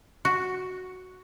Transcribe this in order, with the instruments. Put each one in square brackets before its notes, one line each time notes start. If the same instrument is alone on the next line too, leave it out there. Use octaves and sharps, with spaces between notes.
[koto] F#4